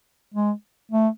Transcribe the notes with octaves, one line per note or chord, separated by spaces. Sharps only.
G#3
A3